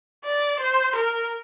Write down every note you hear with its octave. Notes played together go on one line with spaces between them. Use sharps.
D5
C5
A#4